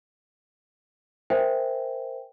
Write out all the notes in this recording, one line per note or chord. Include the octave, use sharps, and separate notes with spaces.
A#4 C5 E5 G5 G#5